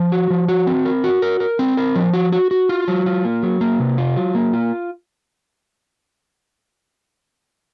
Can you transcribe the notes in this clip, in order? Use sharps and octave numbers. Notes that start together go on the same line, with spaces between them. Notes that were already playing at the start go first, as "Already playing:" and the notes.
Already playing: F3
F#4
F3
F#4
C4
A#4
F#4
A#4
A#4
C4
A#4
F3
F#4
F#4
F#4
F4
F#3
F4
A#3
F#3
A#3
C3
F4
F#3
A#3
F4